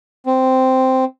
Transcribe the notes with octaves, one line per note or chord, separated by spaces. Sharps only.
C4